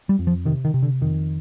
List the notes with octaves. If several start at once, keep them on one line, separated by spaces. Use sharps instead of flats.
G3
F2
F3
C3 D#3
D#3
C3
D3
F2 D#3